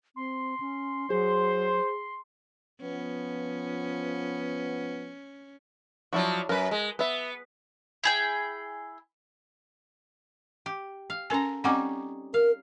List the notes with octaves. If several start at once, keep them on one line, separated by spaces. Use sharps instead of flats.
C4 C6
C#4
F#3 G#4 C5
F3 B3 C#4
F3 F#3 D4 E4 F#4
F#2 A#4 B4
G#3
B3 B4 E5
E4 G#4 G5
G4
F5
C#4 A4 A#4 G#5 A#5
G3 C4 C#4 D#4 F#5 D6
A#4 F5